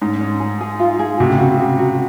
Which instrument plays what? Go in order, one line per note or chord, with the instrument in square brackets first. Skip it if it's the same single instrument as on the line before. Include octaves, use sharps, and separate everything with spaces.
[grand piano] G#2 [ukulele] C#4
[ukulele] C#4
G#4
G#4
F4
G#4
[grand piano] C3 [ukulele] F#4
[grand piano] C#3
[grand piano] C3 [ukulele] F#4
[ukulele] F#4
F#4